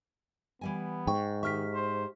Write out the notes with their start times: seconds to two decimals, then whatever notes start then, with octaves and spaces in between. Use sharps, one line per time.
0.61 E3 G3 B3 G#5
1.07 G#2 G5 C#6
1.43 D#3 G4 E5 C#6 F6 B6
1.75 C5